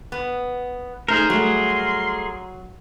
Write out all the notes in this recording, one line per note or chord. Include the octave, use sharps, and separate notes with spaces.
B3
A3 D#4 G#4 A#4 C5
F#3 G3 A3 C6